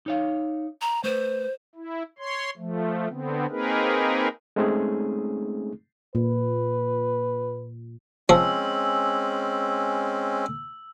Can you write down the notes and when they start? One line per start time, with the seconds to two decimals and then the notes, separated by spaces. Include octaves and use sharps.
0.06 D#4 C#5 F5
0.81 A#5
1.04 A3 B4 C5
1.75 E4
2.19 C#5 C6
2.57 F3 A3
3.09 D3 B3 C4
3.50 A#3 C4 D#4 G#4 A#4 B4
4.56 G#3 A3 C4 C#4 D#4 G#4
6.15 A#2 B4
8.29 F3 G#3 C4 C#4 E6